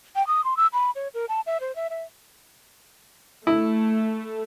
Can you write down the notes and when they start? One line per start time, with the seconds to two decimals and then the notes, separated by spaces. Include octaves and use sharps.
0.16 G5
0.27 D#6
0.45 C6
0.57 E6
0.73 B5
0.95 C#5
1.14 A#4
1.29 A5
1.46 E5
1.61 C5
1.76 E5
1.90 E5
3.47 A3 E4